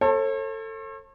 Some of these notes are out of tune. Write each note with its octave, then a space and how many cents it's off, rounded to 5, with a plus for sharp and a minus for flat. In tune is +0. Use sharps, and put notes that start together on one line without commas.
A4 +20 C#5 -45